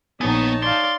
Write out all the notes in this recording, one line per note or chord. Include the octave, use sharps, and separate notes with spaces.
A#1 B3 D#4 C#5 G#5 A5
D5 F5 C6